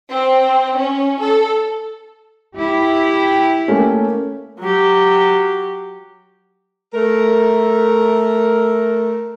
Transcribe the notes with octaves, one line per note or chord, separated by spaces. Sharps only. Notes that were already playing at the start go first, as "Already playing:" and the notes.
C4
C#4
A4
E4 G4
A3 A#3 C#4
F#3 G4
A3 A#4